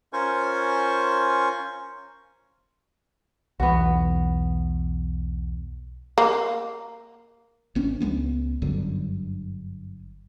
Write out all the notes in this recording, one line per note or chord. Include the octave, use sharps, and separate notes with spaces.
C#4 F4 A#4 C5 G#5 C#6
B1 E2 B3 F#4
A#3
G#1 B3 C#4 D4
C#2 G#3 B3 C#4
G1 F#2 D3